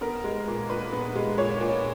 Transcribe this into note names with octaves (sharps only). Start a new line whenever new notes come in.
B3 A#4
G#3
A#2
A#2 B4
B3
G#3
A#2 C#5
A#2